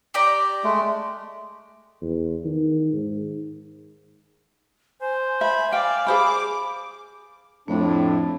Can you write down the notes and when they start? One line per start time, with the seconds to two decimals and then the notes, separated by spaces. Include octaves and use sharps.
0.14 G4 D5 A#5
0.64 G#3 A3
2.02 E2
2.45 D#3
2.93 G#2
5.01 C5 G#5
5.41 E5 B5
5.72 D5 F5 G5
6.07 G#4 C5 B5 D6
7.68 F2 A2 A3 D4